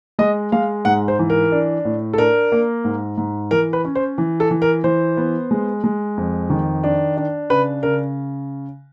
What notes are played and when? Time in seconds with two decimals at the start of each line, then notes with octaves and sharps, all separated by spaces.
0.19 G#3 D#5
0.52 G#3 F5
0.85 G#2 F#5
1.08 C5
1.19 E3
1.30 A#4
1.52 D4
1.85 A2
2.13 A4
2.18 D4 A#4
2.52 A#3
2.85 G#2
3.18 G#2
3.51 E3 A#4
3.73 B4
3.85 C#4
3.95 C5
4.18 E3
4.40 A4
4.51 E3
4.62 A#4
4.84 E3 C5
5.17 B3
5.51 G#3
5.84 G#3
6.17 F2
6.50 D#3
6.84 D4
7.17 D4
7.50 C#3 B4
7.83 C#3 A#4